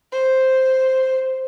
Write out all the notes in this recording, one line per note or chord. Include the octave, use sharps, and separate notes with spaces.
C5